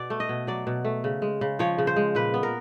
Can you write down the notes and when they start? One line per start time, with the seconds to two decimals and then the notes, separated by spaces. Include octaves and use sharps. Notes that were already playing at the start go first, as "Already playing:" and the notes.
Already playing: B2 D5
0.10 A3
0.20 D#5
0.29 B2
0.47 F#3 D5
0.67 B2
0.85 A3
1.04 C#3
1.22 G#3
1.41 C#3
1.59 F3 C#5
1.78 C#3
1.87 C5
1.96 G#3
2.15 A#2 B4
2.34 B3
2.43 A#4